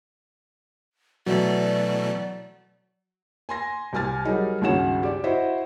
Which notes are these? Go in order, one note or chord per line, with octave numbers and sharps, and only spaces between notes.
B2 E3 F#3 A3 D5
G#5 C6 A#6
C2 G4 G#5 F6 A6
F#3 G3 D#4 G#4 A#4
C#2 G2 D#3 C#4 F#4 E7
G4 D5
E4 F#4 C5 D#5 E5